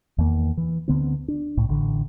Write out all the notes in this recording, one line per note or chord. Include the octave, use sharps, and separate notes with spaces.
E2 D#3 A#3
E3
D2 D3 B3 C4
D4
C2 A2
A1 D3